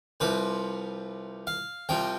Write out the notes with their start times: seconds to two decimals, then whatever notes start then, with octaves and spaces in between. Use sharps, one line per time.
0.20 C2 C3 F3 B4
1.47 F5
1.89 C2 C3 F3 G5